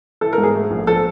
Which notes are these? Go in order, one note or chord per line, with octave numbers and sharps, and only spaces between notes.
E3 A4
A#4
G#2
G#4
A3
A#1
F3 A4